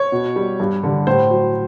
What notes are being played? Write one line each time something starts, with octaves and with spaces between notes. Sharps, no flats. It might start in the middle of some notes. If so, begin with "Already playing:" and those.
Already playing: C#5
B2
G3
G2
D3 G3
A2 C5
F#3